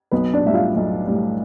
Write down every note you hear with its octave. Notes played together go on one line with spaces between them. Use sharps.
B1 B3 B4
D4 D5
A2 G3 E5
F4 F5
B1
A2 G3